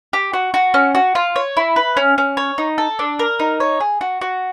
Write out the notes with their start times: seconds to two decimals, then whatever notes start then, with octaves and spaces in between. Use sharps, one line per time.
0.13 G4
0.33 F#4
0.54 F#4
0.74 C#4
0.95 F#4
1.15 F4
1.36 C#5
1.57 E4
1.76 B4
1.97 C#4
2.18 C#4
2.37 C#5
2.58 D#4
2.78 A4
2.99 D4
3.19 A#4
3.40 D#4
3.60 C#5
3.80 G#4
4.01 F#4
4.21 F#4